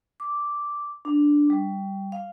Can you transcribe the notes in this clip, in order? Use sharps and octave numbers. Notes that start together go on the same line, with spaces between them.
D6
D4
G3
F5